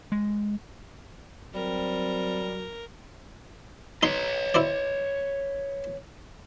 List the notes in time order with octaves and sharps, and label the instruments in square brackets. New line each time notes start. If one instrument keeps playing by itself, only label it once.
[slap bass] G#3
[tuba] F#3 [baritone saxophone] G3 [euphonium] C4 [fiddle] A#4
[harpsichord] D#4 C6 [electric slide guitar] B4 C#5
[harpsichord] E4 C5 D5